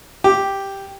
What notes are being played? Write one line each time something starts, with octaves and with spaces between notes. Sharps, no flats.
G4